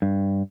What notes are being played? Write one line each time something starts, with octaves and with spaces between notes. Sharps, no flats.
G2